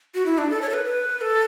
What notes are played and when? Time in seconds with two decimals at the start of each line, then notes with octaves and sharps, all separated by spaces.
0.15 F#4
0.26 E4
0.38 D4
0.50 A4
0.62 C#5
0.69 A4
0.73 B4
0.85 B4
1.21 A4